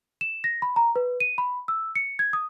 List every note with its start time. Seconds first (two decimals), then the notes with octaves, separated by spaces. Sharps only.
0.21 E7
0.44 A#6
0.62 B5
0.76 A#5
0.96 B4
1.20 D#7
1.38 B5
1.68 E6
1.95 C#7
2.19 G#6
2.33 D#6